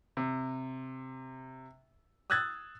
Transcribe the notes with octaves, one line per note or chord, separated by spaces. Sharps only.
C3
D#6 E6 F#6 G#6 A6